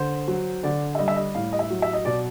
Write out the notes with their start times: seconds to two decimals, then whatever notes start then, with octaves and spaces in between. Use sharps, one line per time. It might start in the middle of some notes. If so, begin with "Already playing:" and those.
Already playing: D3 C5
0.28 F#3
0.63 D3 D5
0.95 E5
0.99 G3 D#5
1.08 E5
1.16 D#5
1.35 A2 F5
1.53 D#5
1.59 E5
1.70 F#3
1.82 E5
1.93 D#5
2.05 B2 D5